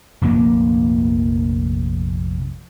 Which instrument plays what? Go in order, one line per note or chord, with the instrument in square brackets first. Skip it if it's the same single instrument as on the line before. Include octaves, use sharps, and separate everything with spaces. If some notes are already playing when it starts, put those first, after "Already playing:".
[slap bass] F1 A#1 A#2 A#3